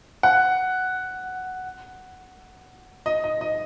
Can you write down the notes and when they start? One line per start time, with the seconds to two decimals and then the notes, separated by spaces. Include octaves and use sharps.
0.23 F#5
3.06 D#5
3.24 D#5
3.41 D#5